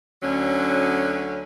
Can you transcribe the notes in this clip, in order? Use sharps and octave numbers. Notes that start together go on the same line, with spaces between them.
D2 D3 F#3 C#4